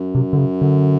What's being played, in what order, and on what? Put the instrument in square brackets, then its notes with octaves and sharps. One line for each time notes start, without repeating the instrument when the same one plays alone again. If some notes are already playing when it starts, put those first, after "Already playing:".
Already playing: [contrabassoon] F#2
[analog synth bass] C3
D3
C#3
D3